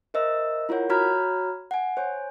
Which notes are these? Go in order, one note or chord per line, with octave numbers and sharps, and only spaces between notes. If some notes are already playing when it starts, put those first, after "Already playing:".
A#4 C5 D#5 E5 E6
E4 F4 A#4 C#5 F#5
F#4 C#5 A#5 B5 F6 G#6
F#5 G#5
C5 C#5 G#5